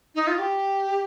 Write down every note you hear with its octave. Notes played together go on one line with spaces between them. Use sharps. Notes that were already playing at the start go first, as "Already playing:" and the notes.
D#4
F4
G4